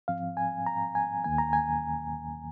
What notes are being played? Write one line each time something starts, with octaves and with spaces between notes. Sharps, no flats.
G#2 F3 C4 F5
G#5
A#5
G#5
D#2 D#3 A#3 G#5
A#5
G#5